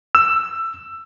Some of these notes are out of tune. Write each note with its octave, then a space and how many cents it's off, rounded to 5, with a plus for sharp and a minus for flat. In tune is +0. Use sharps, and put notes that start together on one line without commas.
E6 +15